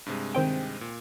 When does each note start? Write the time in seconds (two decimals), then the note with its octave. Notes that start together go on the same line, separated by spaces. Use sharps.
0.06 G2 C3 G#3
0.35 D#3 C4 G5
0.81 A#2